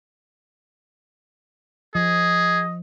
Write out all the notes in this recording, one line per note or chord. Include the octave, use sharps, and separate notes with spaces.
F3 G#4 D#5